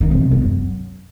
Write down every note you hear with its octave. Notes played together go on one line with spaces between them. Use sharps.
D#3
C3
E2
F2
F#2